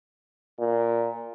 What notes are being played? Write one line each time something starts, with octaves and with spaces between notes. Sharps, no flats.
A#2